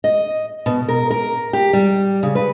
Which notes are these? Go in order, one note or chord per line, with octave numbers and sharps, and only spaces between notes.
D#5
B2
A#4
A#4
G4
G3
C#3
B4